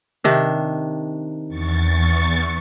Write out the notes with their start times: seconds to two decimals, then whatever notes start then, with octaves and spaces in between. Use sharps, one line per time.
0.24 C3 D#3 D4
1.48 E2 C#6 A6